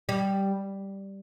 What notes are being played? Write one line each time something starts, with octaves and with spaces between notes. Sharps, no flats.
G3